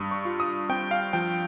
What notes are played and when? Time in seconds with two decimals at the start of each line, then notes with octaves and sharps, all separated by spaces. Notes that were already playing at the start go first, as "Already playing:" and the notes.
Already playing: G2 D#6
0.11 C#6
0.25 F4
0.40 D#6
0.69 C4 G5
0.91 F5
1.13 F3 G5